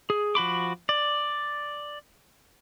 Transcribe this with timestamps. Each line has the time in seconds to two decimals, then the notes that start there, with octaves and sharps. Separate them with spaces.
0.10 G#4
0.35 F3 F#4 B5 D6
0.89 D5